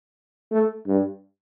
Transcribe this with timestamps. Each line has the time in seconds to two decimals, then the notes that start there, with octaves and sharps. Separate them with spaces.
0.51 A3
0.87 G2